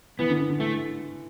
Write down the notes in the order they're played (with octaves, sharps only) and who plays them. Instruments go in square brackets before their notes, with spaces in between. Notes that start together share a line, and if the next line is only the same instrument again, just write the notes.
[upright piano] E3 [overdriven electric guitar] B3
[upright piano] D3
D3
D3
[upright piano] E3 [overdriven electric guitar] A3